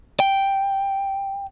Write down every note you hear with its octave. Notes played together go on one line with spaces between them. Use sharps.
G5